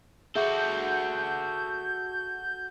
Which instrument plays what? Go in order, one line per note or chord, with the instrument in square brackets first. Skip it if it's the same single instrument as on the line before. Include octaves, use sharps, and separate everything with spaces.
[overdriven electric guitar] F#4 A4 [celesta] G#4 E5 C#6 [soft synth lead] G6